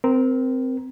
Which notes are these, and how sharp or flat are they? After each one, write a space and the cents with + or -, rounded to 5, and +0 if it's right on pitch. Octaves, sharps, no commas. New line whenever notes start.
C4 -10 A#4 +15